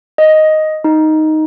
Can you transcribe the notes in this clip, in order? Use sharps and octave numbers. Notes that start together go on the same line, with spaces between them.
D#5
D#4